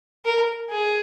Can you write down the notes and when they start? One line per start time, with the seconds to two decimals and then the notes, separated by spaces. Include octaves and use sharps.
0.25 A#4
0.70 G#4